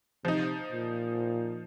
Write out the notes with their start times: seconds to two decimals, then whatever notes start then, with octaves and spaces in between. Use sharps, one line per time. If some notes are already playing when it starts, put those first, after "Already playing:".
0.24 C3 F3 D#4
0.72 A#2